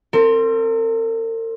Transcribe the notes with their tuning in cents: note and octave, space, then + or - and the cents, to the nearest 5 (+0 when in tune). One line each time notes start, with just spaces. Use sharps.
C4 +10 A#4 -45